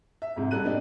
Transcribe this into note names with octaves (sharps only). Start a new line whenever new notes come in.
E5
F2 G#2 C3
A1 F#2 G3 A4 F#6 D#7
B3 D4 D#4 G4